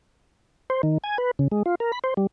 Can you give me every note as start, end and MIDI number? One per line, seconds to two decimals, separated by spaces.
0.70 0.82 72
0.83 0.98 51
1.04 1.18 80
1.18 1.31 71
1.39 1.48 49
1.52 1.63 56
1.66 1.75 65
1.80 1.92 70
1.92 1.99 83
2.04 2.14 72
2.17 2.27 55